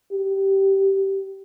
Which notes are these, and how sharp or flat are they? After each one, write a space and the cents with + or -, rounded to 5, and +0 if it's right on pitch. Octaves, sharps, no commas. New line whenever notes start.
G4 -15